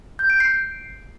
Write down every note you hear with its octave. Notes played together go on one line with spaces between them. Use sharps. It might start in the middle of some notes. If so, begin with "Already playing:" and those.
G6
D7
C7